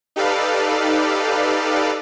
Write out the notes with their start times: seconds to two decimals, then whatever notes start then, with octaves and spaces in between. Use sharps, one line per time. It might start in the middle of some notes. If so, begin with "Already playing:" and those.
0.16 D#4 G4 A4 B4 D5 F5